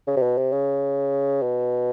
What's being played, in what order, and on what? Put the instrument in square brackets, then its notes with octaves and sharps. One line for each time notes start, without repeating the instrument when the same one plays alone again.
[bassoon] C#3
C3
B2
C3
C#3
B2